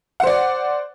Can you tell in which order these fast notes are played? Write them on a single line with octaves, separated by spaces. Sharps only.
F#5 C5 D5